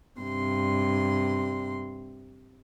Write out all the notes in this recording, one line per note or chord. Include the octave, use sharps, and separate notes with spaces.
G2 C3 C6